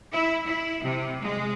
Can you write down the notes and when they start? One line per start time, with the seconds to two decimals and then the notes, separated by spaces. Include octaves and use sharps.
0.12 E4
0.44 E4
0.82 C3
1.22 G#3